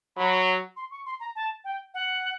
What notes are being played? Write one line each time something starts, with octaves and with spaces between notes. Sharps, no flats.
F#3 B5
C6
C#6
C6
A#5
A5
G5
F#5